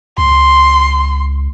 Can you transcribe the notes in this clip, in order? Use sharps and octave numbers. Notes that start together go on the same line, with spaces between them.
C#2 C6